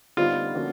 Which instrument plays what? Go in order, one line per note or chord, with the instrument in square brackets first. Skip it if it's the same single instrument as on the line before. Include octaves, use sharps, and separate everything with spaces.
[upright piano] D3 G3 B3 D#4 [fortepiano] F4
[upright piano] D3 F3 A#3 C#4 F#4